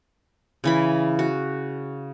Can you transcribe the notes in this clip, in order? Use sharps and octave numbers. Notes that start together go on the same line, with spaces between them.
C#3 E3 B5
F#4